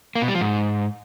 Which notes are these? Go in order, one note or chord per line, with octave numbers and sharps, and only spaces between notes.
A#3
B2
G3
F3
G#2